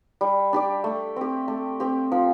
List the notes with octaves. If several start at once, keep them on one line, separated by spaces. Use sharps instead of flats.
G3
D4 G4 D5
A3
C4 G4
A3
C4 G4
F3